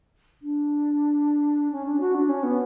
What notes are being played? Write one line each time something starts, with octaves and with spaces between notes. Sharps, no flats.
D4
C#4
D4
F#4
D4
C#4
B3